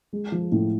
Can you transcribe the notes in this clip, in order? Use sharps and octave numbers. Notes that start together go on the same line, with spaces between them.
G#3
F3
A2